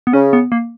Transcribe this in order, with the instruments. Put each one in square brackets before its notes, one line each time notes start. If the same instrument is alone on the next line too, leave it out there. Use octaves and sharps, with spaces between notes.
[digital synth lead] B3
[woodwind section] C#3 [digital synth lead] C#4
[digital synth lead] B3
A#3